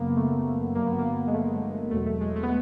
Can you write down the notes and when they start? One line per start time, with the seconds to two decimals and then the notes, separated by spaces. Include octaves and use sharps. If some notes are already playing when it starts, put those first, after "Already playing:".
Already playing: F#2 C#3 F#3 A#3 B3
0.16 A3
0.75 G2 D3 F#3 A#3
0.86 B3
0.99 A#3
1.27 G#3
1.33 A3
1.91 E2 B2 F#3 A3
2.06 A3
2.21 G#3
2.36 A3
2.43 B3